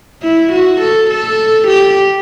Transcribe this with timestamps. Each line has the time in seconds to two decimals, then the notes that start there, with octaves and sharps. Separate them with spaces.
0.23 E4
0.52 F#4
0.80 A4
1.10 A4
1.68 G4